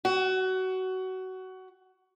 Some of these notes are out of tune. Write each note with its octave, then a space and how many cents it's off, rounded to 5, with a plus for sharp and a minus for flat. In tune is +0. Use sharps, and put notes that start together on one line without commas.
F#4 +20